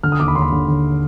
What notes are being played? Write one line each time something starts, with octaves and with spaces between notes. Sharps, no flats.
D3 F6
D#6
D#2 D6
B5
D#2 C6
B5
D3
D3